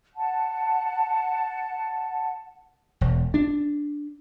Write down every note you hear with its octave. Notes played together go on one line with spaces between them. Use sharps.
F#5 A5
E1
D4